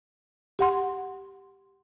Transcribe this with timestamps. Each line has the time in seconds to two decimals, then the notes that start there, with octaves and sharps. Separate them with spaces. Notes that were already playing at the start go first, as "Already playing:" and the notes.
0.59 G4 F#5 C6